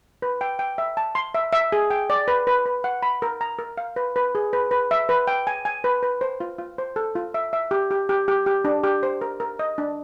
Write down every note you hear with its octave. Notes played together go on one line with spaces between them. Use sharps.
B4
G5
G5
E5
A5
C6
E5
E5
G#4
G5
D5
B4
B4
B4
F#5
B5
A#4
A#5
A#4
F5
B4
B4
G#4
B4
B4
E5
B4
G5
G#5
G#5
B4
B4
C5
F4
F4
C5
A4
F4
E5
E5
G4
G4
G4
G4
G4
D4
G4
C5
A#4
A#4
D#5
D4